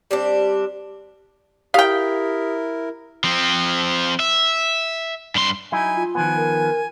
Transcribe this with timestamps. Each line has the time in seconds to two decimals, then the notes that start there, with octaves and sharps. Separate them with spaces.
0.11 G3 C4 D4
1.74 E4 G4 A#4 F5 G5 D#6 B6
3.24 F3 C4
4.20 E5
5.35 G2 C6
5.72 F#3 D#4 E4 G#5
5.96 F4
6.15 D#3 F3 B3 G#5
6.36 A#4